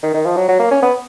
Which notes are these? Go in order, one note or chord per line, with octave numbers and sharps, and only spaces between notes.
D#3
D#3
F3
F#3
F#3
A#3
C#4
B3